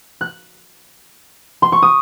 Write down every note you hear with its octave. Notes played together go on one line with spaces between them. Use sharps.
F#6
C6
C#6
D#6